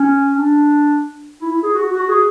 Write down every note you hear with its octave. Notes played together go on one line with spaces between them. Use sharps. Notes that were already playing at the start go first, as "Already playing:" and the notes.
Already playing: C#4
D4
E4
E4
G#4
F#4
F#4
G#4